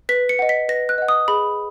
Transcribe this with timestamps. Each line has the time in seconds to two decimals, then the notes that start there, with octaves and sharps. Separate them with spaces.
0.09 B4 B6
0.29 C#7
0.39 D#5 F#5
0.49 B6
0.69 B4 A#6
0.89 F#6
0.98 D#5 F#5
1.08 D#6
1.28 G#4 B5